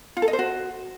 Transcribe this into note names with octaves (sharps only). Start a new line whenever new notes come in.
F4
A4
D#5
C5
F#4